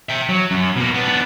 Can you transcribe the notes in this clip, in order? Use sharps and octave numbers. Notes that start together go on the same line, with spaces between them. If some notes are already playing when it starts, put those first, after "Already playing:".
E5 G5
F#3
F#2
B2 A#3
B3 D4